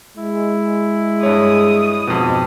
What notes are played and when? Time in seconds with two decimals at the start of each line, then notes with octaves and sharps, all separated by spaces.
0.17 G#3 E4
1.23 G2 C#5 D#6
2.07 F2 G#2 B2